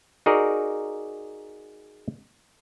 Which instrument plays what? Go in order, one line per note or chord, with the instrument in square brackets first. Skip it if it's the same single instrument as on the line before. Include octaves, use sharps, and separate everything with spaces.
[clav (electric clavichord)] D#4 F#4 G#4 A#4 D5